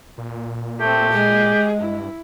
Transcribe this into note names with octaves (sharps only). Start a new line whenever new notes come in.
A#2
A3 C4 G4
G#3 G#4
G2 E4